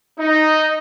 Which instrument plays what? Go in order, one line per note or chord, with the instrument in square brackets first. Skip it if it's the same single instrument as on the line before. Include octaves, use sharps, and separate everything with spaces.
[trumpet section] D#4